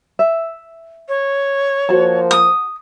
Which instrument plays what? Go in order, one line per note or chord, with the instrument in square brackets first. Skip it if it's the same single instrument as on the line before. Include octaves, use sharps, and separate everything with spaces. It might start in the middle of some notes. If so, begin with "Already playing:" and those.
[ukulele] E5
[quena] C#5
[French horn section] F3 A#3 C5 [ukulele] F#4 A5
[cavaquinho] D#6